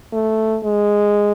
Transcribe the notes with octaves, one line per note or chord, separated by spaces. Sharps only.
A3
G#3